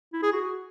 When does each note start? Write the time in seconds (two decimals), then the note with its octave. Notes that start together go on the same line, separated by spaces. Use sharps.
0.13 E4
0.23 G#4
0.33 F#4